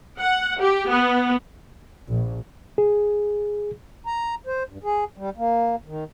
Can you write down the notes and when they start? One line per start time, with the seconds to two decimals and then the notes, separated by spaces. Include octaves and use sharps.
0.20 F#5
0.59 G4
0.89 B3
2.08 A#1
2.78 G#4
4.06 A#5
4.47 C5
4.69 G2
4.84 G#4
5.17 G3
5.37 A#3
5.86 D#3